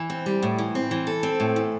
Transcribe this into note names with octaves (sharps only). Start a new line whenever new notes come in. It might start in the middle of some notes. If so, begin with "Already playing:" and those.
Already playing: E3
C4
G3
A2
E3
C4
E3
A4
C4
A2
E3